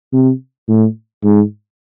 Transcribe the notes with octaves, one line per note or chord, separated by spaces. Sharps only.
C3
A2
G#2